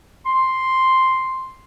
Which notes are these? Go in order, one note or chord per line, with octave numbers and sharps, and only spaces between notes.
C6